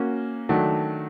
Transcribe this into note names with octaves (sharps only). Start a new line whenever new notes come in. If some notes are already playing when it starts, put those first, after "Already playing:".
Already playing: A#3 C#4 F#4
D#3 F#3 A3 D4